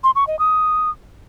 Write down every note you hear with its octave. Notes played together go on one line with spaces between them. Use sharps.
C6
C#6
D#5
D#6